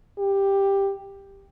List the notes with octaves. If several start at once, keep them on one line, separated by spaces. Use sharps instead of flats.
G4